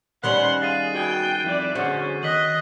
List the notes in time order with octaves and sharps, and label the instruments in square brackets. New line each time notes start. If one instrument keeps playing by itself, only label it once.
[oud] D#3 G3 C#4 [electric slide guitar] B4 C5 [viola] F#5 C6 [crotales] F#6
[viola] G#4 [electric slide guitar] F5 [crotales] A6 C7 D#7
[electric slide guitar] F#4 B4 G#5 [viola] G5
[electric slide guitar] F2 [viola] E4 D5
[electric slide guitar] D3 G#4 C5 [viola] C#4 [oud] F#4
[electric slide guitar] D#3 [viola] D#5 [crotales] F#6 B6 F#7